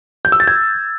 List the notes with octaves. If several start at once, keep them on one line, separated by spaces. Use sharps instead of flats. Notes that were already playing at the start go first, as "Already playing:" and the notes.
G6
E6
A6
G#6